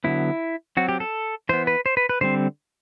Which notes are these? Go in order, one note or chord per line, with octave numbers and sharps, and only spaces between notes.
D3 F#3 B3 E4
F#3 C4 F#4
G4
A4
E3 B3 C5
B4
C5
B4
B4
D3 G3 C4 C5